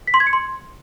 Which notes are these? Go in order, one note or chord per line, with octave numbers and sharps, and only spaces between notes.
B6
C6
G#6
C#7
C6